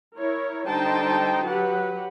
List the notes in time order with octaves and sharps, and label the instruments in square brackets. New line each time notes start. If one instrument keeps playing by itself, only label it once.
[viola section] E4 A#4 C#5
D3 G3 D#4 C5 G5 A5
F#3 G4 B4 F#5